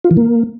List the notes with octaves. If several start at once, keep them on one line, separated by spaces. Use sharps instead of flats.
F4
E3
A#3